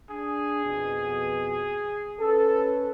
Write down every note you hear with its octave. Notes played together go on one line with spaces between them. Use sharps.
D4 G#4
F2 B2
C#4 A4 B4